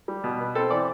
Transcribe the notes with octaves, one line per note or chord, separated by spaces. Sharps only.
G3
B2
B3
C4 A4
E3 D5